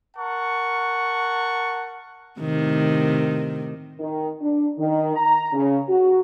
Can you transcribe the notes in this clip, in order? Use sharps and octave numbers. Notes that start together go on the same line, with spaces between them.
A#4 F#5 A5 C#6
A2 C3 D#3
D#3
D4
D#3
A#5
C#3
F#4